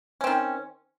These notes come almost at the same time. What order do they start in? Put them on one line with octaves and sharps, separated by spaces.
C#4 C4 D#3